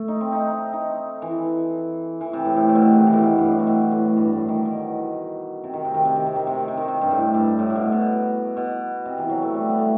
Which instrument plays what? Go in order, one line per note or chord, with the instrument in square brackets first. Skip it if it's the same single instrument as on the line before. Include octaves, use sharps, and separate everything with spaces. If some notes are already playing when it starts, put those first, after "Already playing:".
Already playing: [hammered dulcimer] A3
D#4
C4
D#4
D#4
E3
E3
C3
A2
A2
A2
B2
C3
D#3
E3
A2
B2
G2
A2
C3
B2
A2
G2
A2
D#3
B2
C3
D#3
C3
D#3
C3
D#3
C3
D#3
C3
D#3
C3
D#3
C3
G2
A2
G2
A2
A2
B2
B2
B2
C3
E3
F#3
A3
G3
B3
A3